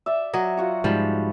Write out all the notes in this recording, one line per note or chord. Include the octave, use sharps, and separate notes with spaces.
D5 E5
F#3 D#5
F4 F#4 F#5
G#2 F3 G3 B4